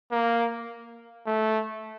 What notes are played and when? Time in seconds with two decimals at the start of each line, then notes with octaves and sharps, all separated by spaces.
0.11 A#3
1.26 A3